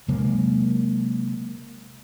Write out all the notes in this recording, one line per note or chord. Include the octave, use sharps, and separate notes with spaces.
C3 F#3 G#3 A#3